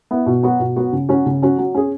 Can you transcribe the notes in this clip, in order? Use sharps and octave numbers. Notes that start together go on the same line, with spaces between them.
B3 E4
B2
F#3 B3 F#4
B2
F#3 B3 F#4
C#3
F#3 C#4 F#4
C#3
F#3 C#4 F#4
F#3
C#4 G#4